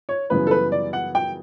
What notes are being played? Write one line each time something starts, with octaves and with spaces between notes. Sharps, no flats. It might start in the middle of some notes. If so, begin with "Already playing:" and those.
C#5
F#2 C#3 E3 G3 B3 B4
A4
B4
D5
F#5
G5